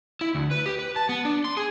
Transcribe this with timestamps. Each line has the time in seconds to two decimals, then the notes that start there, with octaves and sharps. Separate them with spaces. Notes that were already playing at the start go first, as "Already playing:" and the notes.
0.21 E4
0.35 D2
0.51 B4
0.66 G4
0.79 B4
0.96 A5
1.09 B3
1.25 D4
1.44 C6
1.57 G#4